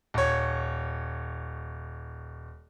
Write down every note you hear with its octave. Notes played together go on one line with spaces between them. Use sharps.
D#1 C#5